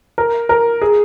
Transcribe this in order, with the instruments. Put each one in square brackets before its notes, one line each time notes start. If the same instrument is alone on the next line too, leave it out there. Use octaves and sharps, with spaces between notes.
[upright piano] A#4
A#4
G#4